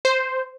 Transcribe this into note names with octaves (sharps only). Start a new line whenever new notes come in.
C5